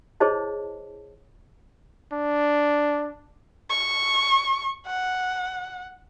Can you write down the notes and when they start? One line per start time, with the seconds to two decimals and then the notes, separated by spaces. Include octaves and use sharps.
0.20 E4 G#4 C5 C#5 D#5 A5
2.13 D4
3.70 C#6
4.86 F#5